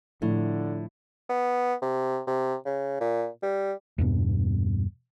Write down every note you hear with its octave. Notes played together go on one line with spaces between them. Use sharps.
A2 D3 F3 A3 E4
B3
C3
C3
C#3
A#2
G3
E2 G2 B2